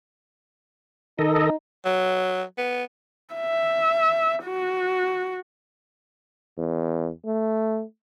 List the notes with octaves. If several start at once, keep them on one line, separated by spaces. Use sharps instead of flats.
D#3 D#4 A4 D#5
F#3
B3
E5
F#4
E2
A3